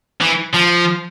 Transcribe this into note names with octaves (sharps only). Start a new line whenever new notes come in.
E3
F3